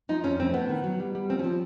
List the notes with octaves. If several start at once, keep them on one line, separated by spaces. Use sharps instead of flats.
F3 D#4
F2 C#4
A2 C4
A2 B3
D#3
F#3
G3
G3
F3 C4
C#4
F3 C4